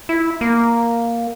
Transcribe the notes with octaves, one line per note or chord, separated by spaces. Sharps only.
E4
A#3